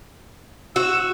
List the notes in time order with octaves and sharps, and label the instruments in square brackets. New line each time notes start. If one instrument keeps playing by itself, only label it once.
[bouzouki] F#4 [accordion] E6